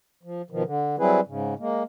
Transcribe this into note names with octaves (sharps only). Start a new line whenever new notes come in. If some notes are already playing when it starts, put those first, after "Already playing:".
F3
B2 D#3 F3
D3
F#3 G3 C4 E4 G#4 B4
G#2 C#3
G#3 A#3